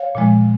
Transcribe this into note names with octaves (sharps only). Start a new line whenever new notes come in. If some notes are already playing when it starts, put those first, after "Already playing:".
Already playing: C#5 F5
A#2 F3 G#3